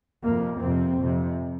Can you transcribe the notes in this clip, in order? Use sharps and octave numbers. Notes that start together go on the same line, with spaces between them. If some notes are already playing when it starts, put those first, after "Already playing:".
F2 C3 A#3
F2 C3 C4
F2 C3